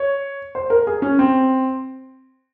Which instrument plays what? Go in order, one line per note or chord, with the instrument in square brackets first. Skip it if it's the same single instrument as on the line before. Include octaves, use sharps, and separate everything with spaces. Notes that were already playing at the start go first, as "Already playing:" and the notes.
Already playing: [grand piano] C#5
C5
A#4
G#4
C#4
C4